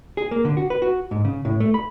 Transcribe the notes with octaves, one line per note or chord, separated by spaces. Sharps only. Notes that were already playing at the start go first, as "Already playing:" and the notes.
G#4
A#3
D3
F#4
B4
F#4
G#2
C#3
A2
A3
B5